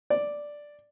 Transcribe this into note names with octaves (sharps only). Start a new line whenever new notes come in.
D5